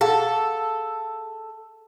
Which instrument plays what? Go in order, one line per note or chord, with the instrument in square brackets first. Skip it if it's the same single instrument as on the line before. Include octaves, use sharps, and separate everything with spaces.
[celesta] G#4 F5 F#5 [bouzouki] A4